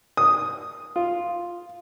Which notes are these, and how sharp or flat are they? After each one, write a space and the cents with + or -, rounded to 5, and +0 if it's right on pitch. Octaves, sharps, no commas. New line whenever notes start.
D#6 +0
F4 +0